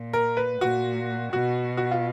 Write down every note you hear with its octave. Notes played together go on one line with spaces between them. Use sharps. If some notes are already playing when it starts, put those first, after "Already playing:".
Already playing: A#2
A#4
B4
A#2 F#4
B2 F#4
F#4
F4